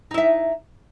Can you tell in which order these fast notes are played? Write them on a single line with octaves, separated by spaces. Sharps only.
D#4 E4 E5